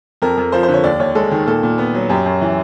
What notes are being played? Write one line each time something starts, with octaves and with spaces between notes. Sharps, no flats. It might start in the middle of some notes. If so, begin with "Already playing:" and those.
F2 A#4
F2
F3 C5
C5
D3
C#5
D#2 D5
D#2 C#5
G#3 A4
D#3
A#2 A4
A#2
B3
F#3
F#2 G4
F#2
E3